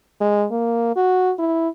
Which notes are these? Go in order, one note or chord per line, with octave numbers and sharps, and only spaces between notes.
G#3
A#3
F#4
E4